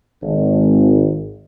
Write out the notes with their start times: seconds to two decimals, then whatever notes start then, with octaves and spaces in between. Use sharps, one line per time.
0.23 G#1